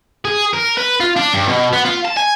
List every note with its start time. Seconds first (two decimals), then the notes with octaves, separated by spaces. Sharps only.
0.25 G#4
0.53 A#4
0.77 B4
1.00 F4
1.16 D4
1.34 G2
1.48 B2
1.73 B3
1.85 F4
2.05 A5
2.17 G#5